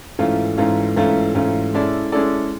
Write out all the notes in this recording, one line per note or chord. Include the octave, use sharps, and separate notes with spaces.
G#2 E3 A3 C#4 F4
G#2 E3 A3 C#4 F4
G#2 E3 A3 C#4 F4
G#2 E3 A3 C#4 F4
G#3 C#4 E4 A4 D5
G#3 C#4 E4 A4 D5